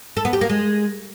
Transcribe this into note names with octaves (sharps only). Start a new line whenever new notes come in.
A4
B3
G4
A#3
G#3